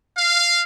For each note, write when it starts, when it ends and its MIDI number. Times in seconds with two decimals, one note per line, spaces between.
0.15 0.62 77